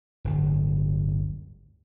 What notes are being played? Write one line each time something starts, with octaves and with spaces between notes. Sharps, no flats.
D1 G1